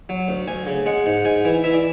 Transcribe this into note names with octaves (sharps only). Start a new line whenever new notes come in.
F#3
D2
D2 G#5
C#3
G#3 F#5
G#2
G#2 G#5
E3
E3 E5
D5